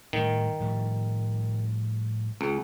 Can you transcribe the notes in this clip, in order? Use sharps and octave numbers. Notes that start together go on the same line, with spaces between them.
A2 D#3 G3
A2 F3 G3
C#2